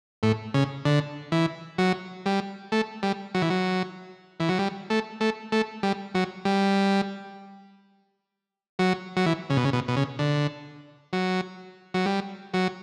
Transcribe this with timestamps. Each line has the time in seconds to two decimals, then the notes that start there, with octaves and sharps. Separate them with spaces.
0.23 A2
0.54 C#3
0.85 D3
1.32 E3
1.78 F#3
2.26 G3
2.72 A3
3.03 G3
3.35 F#3
3.42 E3
3.50 F#3
4.40 E3
4.49 F#3
4.59 G3
4.90 A3
5.21 A3
5.52 A3
5.83 G3
6.15 F#3
6.45 G3
8.79 F#3
9.17 F#3
9.26 E3
9.50 C#3
9.57 B2
9.65 C#3
9.73 B2
9.88 B2
9.97 C#3
10.19 D3
11.13 F#3
11.94 F#3
12.06 G3
12.54 F#3